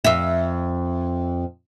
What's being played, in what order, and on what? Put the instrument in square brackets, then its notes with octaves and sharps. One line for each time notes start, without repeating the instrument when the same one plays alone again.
[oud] F2 E5